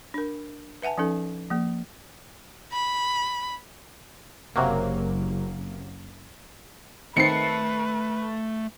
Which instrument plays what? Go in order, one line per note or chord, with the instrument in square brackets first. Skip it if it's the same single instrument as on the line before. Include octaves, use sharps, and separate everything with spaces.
[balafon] D4 A#4
B4 E5 F#5 G#5 A5
F3 C#4 D#4 A4
F3 A#3
[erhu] B5
[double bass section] F#1 [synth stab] C3 F#3 A#3
[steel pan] D#3 C4 D#4 [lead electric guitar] A3 A5 [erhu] B4 [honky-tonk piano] C7 C#7